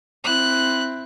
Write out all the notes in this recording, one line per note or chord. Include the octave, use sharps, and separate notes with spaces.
C4 E4 F#6